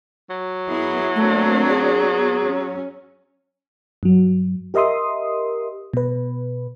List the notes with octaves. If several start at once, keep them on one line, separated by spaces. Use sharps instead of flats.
F#3
B3 E4 G#4
A3 A#3 C4 D4
G#4
B3
C#4
G2 F#3
G4 A#4 D#5 E5 C6 D#6
B2 B4